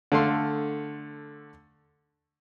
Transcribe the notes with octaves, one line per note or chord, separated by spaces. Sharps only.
D3 A3 F5 C6